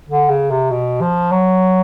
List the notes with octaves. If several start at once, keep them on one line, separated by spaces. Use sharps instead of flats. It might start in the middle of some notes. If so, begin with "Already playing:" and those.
D3
C#3
C3
B2
F3
F#3